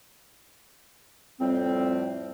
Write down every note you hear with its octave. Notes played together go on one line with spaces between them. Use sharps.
F2 A2 G3 C4